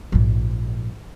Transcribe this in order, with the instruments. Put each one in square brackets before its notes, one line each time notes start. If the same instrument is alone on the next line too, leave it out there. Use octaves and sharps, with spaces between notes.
[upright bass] A#1 G#2